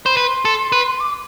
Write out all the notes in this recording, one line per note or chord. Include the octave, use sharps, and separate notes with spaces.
C5 B5
B4 C6
A4
B4
D6